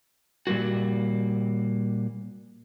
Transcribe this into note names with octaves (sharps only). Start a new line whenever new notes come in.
A#2 G3 G#3 A#3 F#4